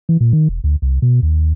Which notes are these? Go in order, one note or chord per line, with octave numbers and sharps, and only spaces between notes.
E3
A#2
D#3
E1
D2
C2
B2
D#2